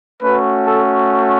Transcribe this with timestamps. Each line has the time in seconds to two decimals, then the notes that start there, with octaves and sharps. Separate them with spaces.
0.22 A3 C#4 F#4 B4
0.67 A4